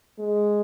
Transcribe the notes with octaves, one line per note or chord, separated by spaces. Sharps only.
G#3